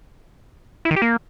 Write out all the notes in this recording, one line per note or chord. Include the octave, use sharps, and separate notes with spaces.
E4
D#3
G4
A#3